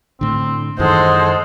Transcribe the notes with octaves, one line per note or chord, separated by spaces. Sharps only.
A2 D3 C4
F#2 D#3 E3 G#3 A4 C5 D#5 F#5